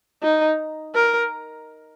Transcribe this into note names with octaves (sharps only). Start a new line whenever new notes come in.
D#4
A#4